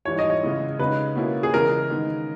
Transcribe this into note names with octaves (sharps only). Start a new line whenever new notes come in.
G#2 E3 G3 C#5
D#5
C#5
C#3 G#3 B3 E4
C#3 G#3 B3 D#4 B4
B2 A#3 C#4 E4
G#4
C#3 E3 G#3 B3 A#4
D#3 G#3 B3 D#4